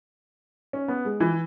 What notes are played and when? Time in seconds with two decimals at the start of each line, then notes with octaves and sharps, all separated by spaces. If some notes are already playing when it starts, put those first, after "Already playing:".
0.73 C#4
0.88 B3
1.05 G#3
1.20 E3